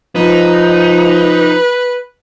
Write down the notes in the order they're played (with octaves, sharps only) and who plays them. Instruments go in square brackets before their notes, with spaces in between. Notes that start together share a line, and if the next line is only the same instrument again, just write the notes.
[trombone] F3 [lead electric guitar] D#4 [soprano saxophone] B4